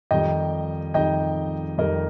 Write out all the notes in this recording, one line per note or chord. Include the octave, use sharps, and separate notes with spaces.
F2 D#3 G3 D#4 D#5 G5
F2 D#3 G3 D#4 D#5 G5
F2 D#3 G3 D#4 A#4 D#5